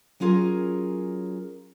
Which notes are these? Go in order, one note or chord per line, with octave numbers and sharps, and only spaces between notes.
F#3 C#4 F4 G#4 A#4